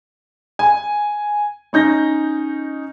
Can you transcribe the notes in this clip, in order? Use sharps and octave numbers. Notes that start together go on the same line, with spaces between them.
G#5
C#4 D#4 G6 A#6